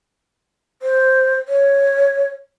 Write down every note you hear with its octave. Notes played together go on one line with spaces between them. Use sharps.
C5
C#5